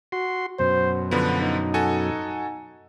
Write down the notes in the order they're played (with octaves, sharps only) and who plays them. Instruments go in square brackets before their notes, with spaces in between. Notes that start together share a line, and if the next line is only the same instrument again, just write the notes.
[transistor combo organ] F#4 C6
[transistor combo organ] F#2 B2 [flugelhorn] C5
[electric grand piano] D3 F3 B3 [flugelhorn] B4
[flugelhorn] D#4
[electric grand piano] F#4 A4 G#5